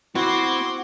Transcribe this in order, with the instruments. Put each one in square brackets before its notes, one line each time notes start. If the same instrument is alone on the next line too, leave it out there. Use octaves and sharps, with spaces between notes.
[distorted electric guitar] C4 [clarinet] E4 [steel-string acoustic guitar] F#4 [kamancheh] C6 D6